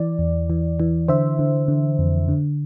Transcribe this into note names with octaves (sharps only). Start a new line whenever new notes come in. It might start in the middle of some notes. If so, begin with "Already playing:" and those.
Already playing: E3 D5
E2
E3
E3
D3 C5 E5
D3
D3
F2
D3